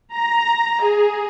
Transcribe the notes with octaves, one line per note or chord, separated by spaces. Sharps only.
A#5
G#4